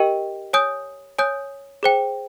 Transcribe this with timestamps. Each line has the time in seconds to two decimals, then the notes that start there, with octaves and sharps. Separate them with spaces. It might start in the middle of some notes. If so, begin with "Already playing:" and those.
Already playing: G4 A#4 D#5 G5
0.53 C#5 G#5 D#6 G6
1.18 C#5 G#5 D#6 G6
1.83 G#4 C5 G5